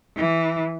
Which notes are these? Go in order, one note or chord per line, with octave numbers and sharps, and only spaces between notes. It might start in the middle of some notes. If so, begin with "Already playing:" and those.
E3